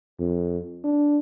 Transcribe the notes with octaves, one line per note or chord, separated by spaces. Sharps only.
F2
D4